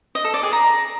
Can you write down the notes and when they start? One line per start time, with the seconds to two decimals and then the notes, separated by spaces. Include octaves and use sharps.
0.15 D#5
0.24 A4
0.34 D5
0.43 G#4
0.53 A#5